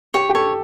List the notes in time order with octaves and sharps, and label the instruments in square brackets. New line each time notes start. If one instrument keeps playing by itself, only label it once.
[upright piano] G4 [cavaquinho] C#5
[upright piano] G4
[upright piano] A4 [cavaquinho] C#5